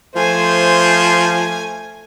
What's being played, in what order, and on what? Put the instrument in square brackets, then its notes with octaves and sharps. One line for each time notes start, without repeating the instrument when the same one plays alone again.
[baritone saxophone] F3 [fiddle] A3 G#5 [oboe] C5